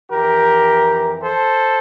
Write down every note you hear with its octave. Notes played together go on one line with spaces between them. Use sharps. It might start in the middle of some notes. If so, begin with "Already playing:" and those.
F2 E3 G4 A#4
A4 C5